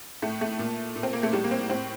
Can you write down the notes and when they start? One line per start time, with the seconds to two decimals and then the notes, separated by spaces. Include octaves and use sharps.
0.22 A2 A3
0.41 A3
0.59 A#2
0.96 A#2
1.03 C4
1.13 A#3
1.23 A3
1.33 A2 G3
1.44 A#3
1.51 C4
1.70 A2 C4